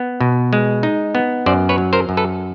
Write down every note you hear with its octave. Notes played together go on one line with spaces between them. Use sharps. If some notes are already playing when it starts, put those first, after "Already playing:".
Already playing: B3
B2
G#3
D#4
B3
F#2 C5 D5
B4 C#5
F#3
A#4 C5
F#2
A4 B4